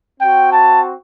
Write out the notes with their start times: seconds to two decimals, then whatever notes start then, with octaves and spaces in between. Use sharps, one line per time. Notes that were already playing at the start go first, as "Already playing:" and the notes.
0.20 C4 F#4 G5
0.52 A5